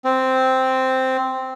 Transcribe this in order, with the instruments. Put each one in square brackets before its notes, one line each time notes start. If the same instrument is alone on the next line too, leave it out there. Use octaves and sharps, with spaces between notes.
[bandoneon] C4